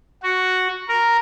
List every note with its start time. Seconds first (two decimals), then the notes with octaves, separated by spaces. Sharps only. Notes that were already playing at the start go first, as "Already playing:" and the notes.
0.23 F#4
0.89 A#4